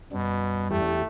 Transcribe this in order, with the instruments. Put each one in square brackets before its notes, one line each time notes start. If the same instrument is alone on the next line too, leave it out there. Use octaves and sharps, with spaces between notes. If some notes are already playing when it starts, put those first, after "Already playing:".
[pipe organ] F#2 G3 [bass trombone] B2
[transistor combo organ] E2 G4 [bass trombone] A3